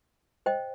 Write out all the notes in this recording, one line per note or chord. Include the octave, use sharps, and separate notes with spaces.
C5 D#5 G5